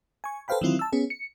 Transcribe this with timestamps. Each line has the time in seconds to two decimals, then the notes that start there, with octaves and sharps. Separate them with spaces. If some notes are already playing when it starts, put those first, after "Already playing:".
0.24 G#5 C#6
0.48 A4 B4 C5 F5 G5 B5
0.61 D#3 E3 F#3 C4 E4 F4
0.79 A5 E6
0.92 B3 C#4 G#4
1.10 C#7